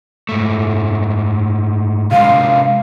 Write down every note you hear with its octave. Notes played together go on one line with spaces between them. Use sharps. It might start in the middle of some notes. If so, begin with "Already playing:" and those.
G#2 A3
C3 G#3 F5